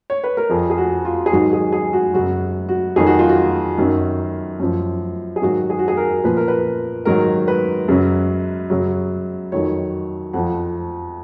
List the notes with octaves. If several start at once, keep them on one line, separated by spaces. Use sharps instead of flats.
C#5
B4
A#4
F2 F3 G#4
G#4
F#4
F4
G#4
G#2 D#3 F#3 F#4
G#4
G#4
F#4
F#2 C#3 F#3 F#4
F#4
F2 D#3 F#3 G#4
F#4
F4
F#4
F#2 D#3 F#3
F#2 F3
G#4
G#2 D#3 F#3 F#4
G#4
F#4
G#4
A#4
A#2 F3 B4
A#4
B4
G#2 D#3 F#3 A#4
B4
F#2 C#3 F#3
F#2 C#3 F#3
F2 D#3 F#3 C#5
F2 F3 F#5